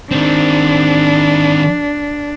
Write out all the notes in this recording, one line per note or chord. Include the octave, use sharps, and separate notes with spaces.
D#3 C4 D4